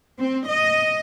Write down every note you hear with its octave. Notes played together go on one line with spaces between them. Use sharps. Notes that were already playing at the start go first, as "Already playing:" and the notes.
C4
D#5